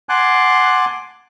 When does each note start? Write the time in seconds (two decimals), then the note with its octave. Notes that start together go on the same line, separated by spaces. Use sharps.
0.09 F#5 G#5 A5 C6 D6 F#6